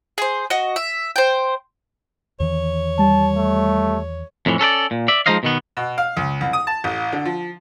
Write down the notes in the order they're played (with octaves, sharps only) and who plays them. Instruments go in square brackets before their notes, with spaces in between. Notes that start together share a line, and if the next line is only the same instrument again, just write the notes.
[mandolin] G#4 C5
F#4 D#5
E5
C5 G5
[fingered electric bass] E2 D#3 E3 [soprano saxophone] C#5
[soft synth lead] G3 [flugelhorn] A5
[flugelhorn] A3
[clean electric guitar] F2 A2 E3
C#4 A4 B4 D5
A#2
D5 E5
F3 G#3 D#4 C5 D#5 F5
B2 D#3 B3
[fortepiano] B2
F5
C#2
C2
D#6
A5
A1
D3
F3